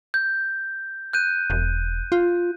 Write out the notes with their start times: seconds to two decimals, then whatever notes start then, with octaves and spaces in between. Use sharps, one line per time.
0.14 G6
1.13 F#6 G6 D#7
1.50 E1
2.12 F4